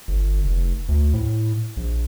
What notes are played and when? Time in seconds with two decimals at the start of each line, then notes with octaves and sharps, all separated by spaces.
0.08 G1
0.45 F1
0.89 D2
1.13 A2
1.77 A#1